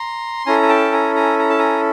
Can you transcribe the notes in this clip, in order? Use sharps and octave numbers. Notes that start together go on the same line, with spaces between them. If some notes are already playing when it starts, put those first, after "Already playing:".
Already playing: A#5 C6
C#4 E4 A4 G#5 A#5
G#5
G5 A5
G#5 A#5
G#5 A#5
A#5
A5
G#5 A#5